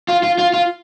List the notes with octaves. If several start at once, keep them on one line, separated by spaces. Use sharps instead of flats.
F4
F4
F4
F4